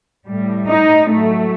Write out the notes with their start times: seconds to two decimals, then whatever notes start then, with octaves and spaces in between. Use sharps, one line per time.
0.26 A2 G3
0.68 D#4
1.09 A2 F#3 A3